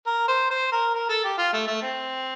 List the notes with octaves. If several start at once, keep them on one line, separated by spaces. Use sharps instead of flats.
A#4
C5
C5
A#4
A#4
A4
G4
F4
A3
A3
C4